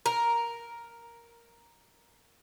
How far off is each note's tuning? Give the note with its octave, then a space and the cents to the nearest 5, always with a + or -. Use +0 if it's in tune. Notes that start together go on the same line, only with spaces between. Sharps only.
A#4 +5